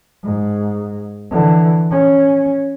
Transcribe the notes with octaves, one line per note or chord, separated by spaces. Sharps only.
G#2
D3 E3
C#4